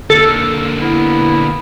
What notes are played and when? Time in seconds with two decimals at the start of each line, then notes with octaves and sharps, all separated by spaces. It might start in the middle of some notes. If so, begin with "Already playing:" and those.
0.10 D3 A#3 A4
0.81 B3 E4